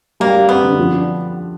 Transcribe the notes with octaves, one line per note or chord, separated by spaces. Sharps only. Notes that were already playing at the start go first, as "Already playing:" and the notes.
G3 A#3
G3
B3 C4
D3
F3
D4